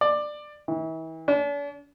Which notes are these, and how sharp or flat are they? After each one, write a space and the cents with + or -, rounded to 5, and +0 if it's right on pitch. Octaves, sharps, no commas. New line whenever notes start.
D5 +15
E3 -35
D4 -45